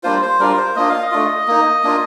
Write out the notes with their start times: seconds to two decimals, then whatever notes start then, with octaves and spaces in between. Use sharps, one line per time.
0.03 G3 A#3 D4 F4 C5
0.22 C5
0.39 G3 D4 F4 A#4
0.58 C5
0.76 A#3 D4 F4 D#5
0.89 F5
1.02 D#5
1.11 A3 D4 F4
1.48 A#3 D#4
1.84 A#3 D4 F4